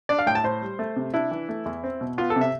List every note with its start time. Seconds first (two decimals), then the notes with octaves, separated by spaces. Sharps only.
0.09 D4 D5
0.19 F5
0.26 A2 G5
0.35 A5
0.44 A2 C5
0.62 G3
0.79 A3
0.96 C3
1.14 D4 E4
1.31 E3
1.49 A3
1.65 E2
1.84 C4
2.01 B2
2.18 B3 F4
2.30 A4
2.36 C3
2.41 E5